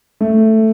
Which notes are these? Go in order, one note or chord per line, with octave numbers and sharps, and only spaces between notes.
A3